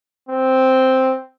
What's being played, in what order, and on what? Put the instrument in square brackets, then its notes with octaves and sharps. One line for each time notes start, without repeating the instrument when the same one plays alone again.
[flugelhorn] C4